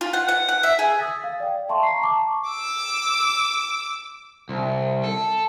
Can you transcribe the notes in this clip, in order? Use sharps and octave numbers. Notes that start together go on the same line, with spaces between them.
F4
F#5
F#5
F#5
E5
G#4
D#6 E6 G#6 A6 B6
F5
D5 G5
E5 F5 A5 C6 C#6
A#5 C7
A5 C#6 D6
D6 E6
C2
A4